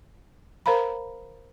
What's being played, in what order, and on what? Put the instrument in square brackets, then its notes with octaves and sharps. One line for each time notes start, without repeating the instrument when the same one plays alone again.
[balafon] A#4 C5 F5 A#5 B5